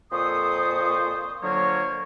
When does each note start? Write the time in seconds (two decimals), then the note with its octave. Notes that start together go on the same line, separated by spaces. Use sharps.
0.12 F2 A#2 A4 C5 C#6 D#6
1.42 D3 F3 F#3 A#3 C#5